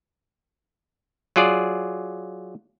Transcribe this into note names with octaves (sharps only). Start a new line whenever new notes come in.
F#3 F4 G#4 D5